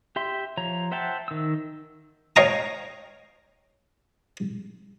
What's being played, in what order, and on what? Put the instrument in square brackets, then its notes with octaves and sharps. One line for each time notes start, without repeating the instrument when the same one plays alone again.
[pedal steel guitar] G4 E5 C6
F3 C#5 A#5
C5 E5 F#5 G5 A5
D#3 E6
[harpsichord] C#5 D#5 F5 G5 A#5 D#6